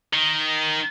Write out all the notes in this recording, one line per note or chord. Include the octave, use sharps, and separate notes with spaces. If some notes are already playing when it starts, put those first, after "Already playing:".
D#3